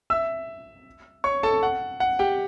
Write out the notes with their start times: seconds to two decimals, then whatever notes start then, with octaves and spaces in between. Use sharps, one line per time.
0.10 E5 E6
1.24 C#5 C#6
1.43 A4 A5
1.63 F#5
2.00 F#5
2.19 G4 G5